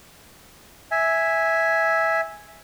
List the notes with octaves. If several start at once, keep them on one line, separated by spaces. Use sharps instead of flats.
E5 G#5